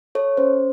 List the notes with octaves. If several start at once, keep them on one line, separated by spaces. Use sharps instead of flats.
A4 C#5
C#4 C5